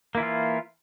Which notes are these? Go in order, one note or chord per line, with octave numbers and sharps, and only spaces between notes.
E3 A#3 E4 F4